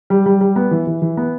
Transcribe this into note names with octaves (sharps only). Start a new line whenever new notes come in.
G3
G3
G3
B3
E3
E3
E3
B3